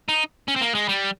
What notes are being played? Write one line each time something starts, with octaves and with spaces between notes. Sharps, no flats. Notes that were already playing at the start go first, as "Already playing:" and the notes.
D#4
C#4
C4
A#3
G#3
G3